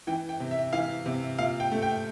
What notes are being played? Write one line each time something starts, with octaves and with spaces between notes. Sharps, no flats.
E3 G5
G5
C3
E5
E3 F5
C3
A#2 F5
G5
A3
G5